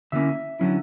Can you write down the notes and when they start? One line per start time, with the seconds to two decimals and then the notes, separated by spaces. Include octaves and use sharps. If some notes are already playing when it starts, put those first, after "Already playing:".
0.12 D3 F#3 A#3 C#4 E4 E5
0.60 D3 F#3 A#3 C#4 E4